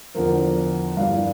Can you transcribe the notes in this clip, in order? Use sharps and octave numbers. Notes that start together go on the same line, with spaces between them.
E2 D3 F3 A#4
G2 E3 G3 F5